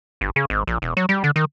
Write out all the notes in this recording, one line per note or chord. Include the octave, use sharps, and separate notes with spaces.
G1
C#3
G#1
A#1
E1
F#3
G3
D3
D#3